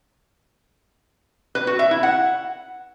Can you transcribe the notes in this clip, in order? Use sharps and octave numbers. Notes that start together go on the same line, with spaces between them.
B4
F#4
E5
E4
F#5